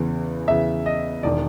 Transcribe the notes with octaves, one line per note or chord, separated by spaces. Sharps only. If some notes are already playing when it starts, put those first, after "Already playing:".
Already playing: E2 C#3 E3
E2 C#3 E3 E5
D#5
E1 D#3 D5